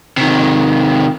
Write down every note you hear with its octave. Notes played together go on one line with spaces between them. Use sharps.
C3 D#3